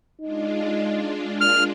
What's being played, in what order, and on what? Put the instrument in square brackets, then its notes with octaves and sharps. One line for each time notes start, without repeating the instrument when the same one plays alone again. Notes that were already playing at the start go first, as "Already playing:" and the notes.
[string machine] G#3 D4 F4 [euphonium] D#4
[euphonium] A#2 [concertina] F6